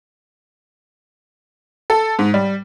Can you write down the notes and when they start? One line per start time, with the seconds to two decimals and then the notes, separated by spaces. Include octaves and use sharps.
1.90 A4
2.19 G#2
2.34 G3